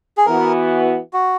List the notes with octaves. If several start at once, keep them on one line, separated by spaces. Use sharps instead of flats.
G#4
E3 B3 F#4 A#4
F#4